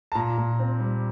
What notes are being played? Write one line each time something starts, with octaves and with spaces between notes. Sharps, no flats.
A5
A#2 A#5
A#2
C4
G3